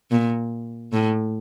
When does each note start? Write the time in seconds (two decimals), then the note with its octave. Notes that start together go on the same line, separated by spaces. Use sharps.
0.11 A#2
0.93 A2